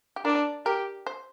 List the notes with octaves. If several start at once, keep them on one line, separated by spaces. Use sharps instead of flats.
G4
D4 A#4
G4 A#4
C5